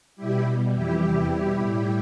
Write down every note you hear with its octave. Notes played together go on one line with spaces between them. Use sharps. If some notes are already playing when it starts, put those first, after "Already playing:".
B2 G3 E4 G4
B2 G3
F2 E3 G3 E4 G4
E2 C3 E3 G3
B2 G3
A2 G3 E4 G4